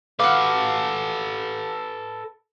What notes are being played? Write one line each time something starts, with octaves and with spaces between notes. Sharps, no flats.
F#4 A4 B4 F5 D6